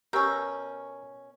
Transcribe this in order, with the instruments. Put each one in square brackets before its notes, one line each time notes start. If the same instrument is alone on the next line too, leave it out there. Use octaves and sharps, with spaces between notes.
[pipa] B2 C#4 [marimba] G4 [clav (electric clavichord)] A#4 [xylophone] C#6 E6 G6